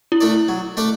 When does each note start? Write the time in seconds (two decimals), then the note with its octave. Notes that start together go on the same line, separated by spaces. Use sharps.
0.12 E4
0.21 A3 D4 A4 D5
0.48 F#3
0.77 A3 D4 A4 D5